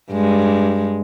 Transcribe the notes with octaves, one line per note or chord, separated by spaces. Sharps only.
G2 G#3